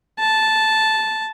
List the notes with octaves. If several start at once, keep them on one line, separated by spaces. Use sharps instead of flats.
A5